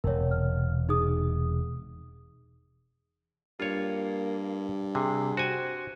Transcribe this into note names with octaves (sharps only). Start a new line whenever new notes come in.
E1 C3 A#4 C#5
F6
D#4 G#4 D#6
G2 A#3 F4 C#5
C3 G#4
F#4 C5 G#5